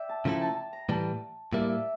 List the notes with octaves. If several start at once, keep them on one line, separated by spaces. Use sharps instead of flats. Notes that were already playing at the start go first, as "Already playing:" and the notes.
Already playing: D5 E5 G5
A5
C#3 F3 A3 E4 A4 A#5
A5
A5
A#5
A2 E3 G3 A5
A2 G3 A#3 E5
D5
E5